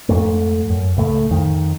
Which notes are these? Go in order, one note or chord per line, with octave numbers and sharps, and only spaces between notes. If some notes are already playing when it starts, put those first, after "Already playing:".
F2 G#2 A3
F#2
C#2 A2 A3
F2 D#3